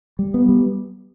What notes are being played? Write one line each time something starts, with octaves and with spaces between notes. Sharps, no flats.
G3
B3
G3